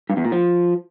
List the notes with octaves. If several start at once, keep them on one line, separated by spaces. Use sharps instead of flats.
G2
E2
A#2
F3